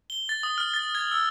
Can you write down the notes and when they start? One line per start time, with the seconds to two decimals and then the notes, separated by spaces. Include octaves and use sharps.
0.10 G7
0.29 A6
0.43 D#6
0.58 F6
0.74 A6
0.95 G#6
1.12 E6